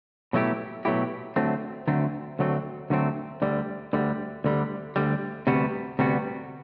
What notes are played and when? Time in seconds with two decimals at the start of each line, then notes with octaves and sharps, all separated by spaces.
0.33 B2 F#3 A3 E4 G4
0.85 B2 F#3 A3 E4 G4
1.36 D2 D3 F#3 A3 C4
1.87 D2 D3 F#3 A3 C4
2.39 D2 D3 F#3 A3 C4
2.90 D2 D3 F#3 A3 C4
3.42 D2 D3 G3
3.93 D2 D3 G3
4.44 D2 D3 G3
4.96 D2 D3 G3
5.47 D2 C3 G3 B3 F#4
5.99 D2 C3 G3 B3 F#4